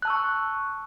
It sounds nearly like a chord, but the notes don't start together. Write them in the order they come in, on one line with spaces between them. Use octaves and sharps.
F#6 A5 E6 C#6